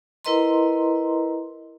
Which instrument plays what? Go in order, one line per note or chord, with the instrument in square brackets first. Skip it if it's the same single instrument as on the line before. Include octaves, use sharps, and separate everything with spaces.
[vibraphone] E4 A#4 B4 D#5 A#5 C6